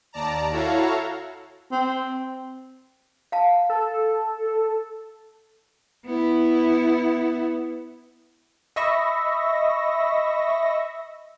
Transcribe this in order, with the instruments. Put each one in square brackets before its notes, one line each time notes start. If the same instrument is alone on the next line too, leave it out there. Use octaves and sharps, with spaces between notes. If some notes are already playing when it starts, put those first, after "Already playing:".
[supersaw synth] D#2 D5 A5 A#5
E4 F#4 A4 C#5 F5 A#5
[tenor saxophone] C4
[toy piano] F5 A5
[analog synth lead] A4
[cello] B3 E4
[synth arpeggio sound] D#5 E5 B5 C#6 E6 A#6